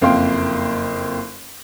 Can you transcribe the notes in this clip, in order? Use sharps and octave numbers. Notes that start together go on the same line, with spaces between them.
F#1 F2 A#3 F5 G5 C6